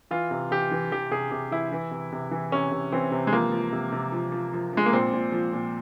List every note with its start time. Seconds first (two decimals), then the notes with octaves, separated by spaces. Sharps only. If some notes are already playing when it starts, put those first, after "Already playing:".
0.11 E3 F4
0.31 C3
0.51 E3 G4
0.71 E3
0.92 E3 G4
1.11 C3 G#4
1.31 C3 G4
1.51 E3 E4
1.72 E3
1.91 C3
2.12 C3
2.31 E3
2.52 C3 C#4
2.71 C3
2.92 E3 C4
3.12 C3
3.27 G#3
3.32 F3 A#3
3.52 F3
3.72 C3
3.92 C3
4.12 F3
4.32 F3
4.53 F3
4.73 F3 G#3
4.86 A#3
4.93 A#2 C4
5.13 A#2
5.32 F3
5.53 A#2